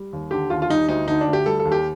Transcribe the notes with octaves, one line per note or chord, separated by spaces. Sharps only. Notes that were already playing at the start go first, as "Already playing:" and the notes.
Already playing: G3
D#2
D3 G4
D#2 F4
F4
G3 D#4
D2 D#4
D3 D#4
D4
D2
G4
G3 A4
A4
D#2
G4